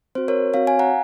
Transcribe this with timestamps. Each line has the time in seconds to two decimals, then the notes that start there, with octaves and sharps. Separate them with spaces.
0.15 C4 F#4 C5
0.28 A#4 C#5
0.54 C4 F#4 C#5 F5
0.67 F5 G#5
0.79 F#5 A#5